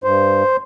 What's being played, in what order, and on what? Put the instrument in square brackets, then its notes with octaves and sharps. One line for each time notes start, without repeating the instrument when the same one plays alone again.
[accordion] G2 C5